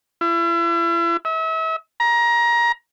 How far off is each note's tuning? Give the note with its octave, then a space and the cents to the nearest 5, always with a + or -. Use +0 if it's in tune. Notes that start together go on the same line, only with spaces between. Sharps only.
E4 +40
E5 -35
A#5 +20